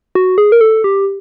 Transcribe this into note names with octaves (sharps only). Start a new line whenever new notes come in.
F#4
G#4
A#4
A4
G4